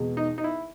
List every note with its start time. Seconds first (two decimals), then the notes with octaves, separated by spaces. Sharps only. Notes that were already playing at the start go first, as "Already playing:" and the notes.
Already playing: E2 B2 G#3
0.17 D#4
0.38 D#4
0.44 E4